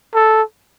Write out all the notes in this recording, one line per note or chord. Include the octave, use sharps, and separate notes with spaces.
A4